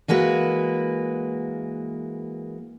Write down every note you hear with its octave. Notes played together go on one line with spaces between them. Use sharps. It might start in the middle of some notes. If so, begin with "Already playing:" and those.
E3 G#3 A#3 F#4 B4